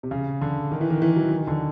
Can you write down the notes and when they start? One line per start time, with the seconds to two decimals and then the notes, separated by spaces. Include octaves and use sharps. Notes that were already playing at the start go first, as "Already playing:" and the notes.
0.03 C3
0.11 C#3
0.41 D3
0.72 D#3
0.81 E3
0.90 D#3
1.02 E3
1.16 F#3
1.32 D#3
1.47 D3